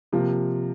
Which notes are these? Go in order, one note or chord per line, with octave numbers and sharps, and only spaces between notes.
C3 F3 A#3